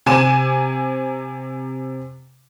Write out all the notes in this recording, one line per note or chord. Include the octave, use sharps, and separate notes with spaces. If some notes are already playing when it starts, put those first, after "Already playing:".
C3 G#5 D6 E7